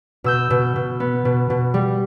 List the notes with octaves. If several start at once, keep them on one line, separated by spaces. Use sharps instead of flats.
B2 E6 G6
B2
B2
B3
B2
B2
G3